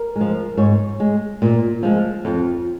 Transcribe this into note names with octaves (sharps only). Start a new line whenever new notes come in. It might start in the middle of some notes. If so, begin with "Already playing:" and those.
Already playing: A#4
G#3
F3
G#2 C#5
G#3
A#2
F3 G#3
F2